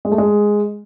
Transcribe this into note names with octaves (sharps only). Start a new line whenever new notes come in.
G#3
A3
G#3